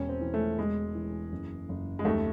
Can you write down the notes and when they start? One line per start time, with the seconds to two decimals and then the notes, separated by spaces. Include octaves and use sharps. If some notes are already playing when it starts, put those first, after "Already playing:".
Already playing: E1 C#4
0.09 C4
0.21 E3
0.34 A3
0.58 E1 G#3
0.95 E3
1.32 F#1
1.69 F#1
1.99 G#3
2.05 D#2 A3